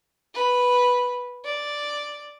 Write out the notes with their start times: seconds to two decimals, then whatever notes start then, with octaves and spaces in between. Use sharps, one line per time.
0.35 B4
1.45 D5